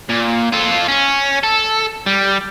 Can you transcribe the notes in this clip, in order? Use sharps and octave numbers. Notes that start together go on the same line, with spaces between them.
A#2
F4 A4
C#4
A4
G3